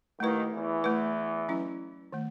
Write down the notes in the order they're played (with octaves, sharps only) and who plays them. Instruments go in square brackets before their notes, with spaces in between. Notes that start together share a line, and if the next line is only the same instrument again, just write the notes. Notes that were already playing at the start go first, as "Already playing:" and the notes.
[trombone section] D#2 D#3 [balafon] A3 E4 B4
[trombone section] E2 E3
[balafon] A3 E4 B4
F#3 C#4 E4
D#3 A3